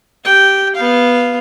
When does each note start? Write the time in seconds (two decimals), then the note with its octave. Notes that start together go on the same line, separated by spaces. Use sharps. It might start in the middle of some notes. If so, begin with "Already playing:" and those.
0.24 G4 G5
0.75 B3 F5